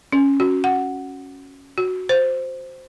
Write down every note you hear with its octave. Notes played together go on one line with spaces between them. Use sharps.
C#4
F#4
F#5
F#4
C5